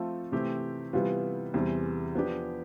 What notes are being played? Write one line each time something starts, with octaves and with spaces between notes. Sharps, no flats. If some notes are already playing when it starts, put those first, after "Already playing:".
Already playing: F3 A3 C4 F4 A4
C3 E3 A3 C4 G4
C3 E3 G3 B3 F4
E2 C3 E3 G3 C4
F3 B3 D4 G4